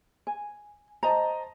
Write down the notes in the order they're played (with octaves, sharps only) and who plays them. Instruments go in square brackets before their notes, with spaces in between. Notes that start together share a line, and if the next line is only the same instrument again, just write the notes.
[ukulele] G#5
[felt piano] C5 D#5 A5 [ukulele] A#5